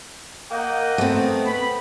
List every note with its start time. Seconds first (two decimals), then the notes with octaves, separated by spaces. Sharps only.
0.51 A#3 A#4 D#5 F#5 G5
0.98 A3 B3 C4
1.45 B5